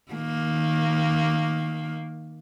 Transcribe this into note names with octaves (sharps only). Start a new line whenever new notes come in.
D#3 A#3